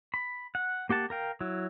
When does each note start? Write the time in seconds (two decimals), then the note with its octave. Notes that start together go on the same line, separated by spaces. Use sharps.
0.14 B5
0.55 F#5
0.89 A#3 G4 F#5 A5
1.10 A#4 F5 G5
1.41 F#3 E4